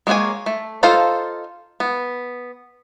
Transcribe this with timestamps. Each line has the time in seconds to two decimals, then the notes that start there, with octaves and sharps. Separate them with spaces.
0.07 G#3 A#3 D4 C#5 G#5
0.46 A3
0.83 D#4 F4 A4 C5 F5
1.80 B3